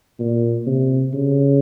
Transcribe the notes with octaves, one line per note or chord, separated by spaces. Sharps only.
A#2
C3
C#3